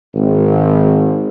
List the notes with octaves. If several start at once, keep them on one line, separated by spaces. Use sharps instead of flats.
G#1